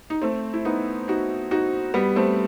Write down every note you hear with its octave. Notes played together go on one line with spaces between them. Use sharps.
D#4
A3 C4
E4
B3 D#4
D#4 F#4
D#4 F#4
G3 B3
A3 C4